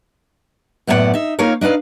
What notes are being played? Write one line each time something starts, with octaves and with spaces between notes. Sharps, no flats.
F#2 A2 B3 A#4 D5 F#5
D#4 E5
A#3 D#4 F4 A#4 C#5 F5
D4 D#4 B4 F5